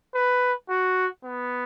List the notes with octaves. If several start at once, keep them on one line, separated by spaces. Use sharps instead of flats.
B4
F#4
B3